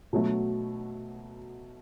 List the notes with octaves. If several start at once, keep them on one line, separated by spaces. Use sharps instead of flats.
B2 F#3 A3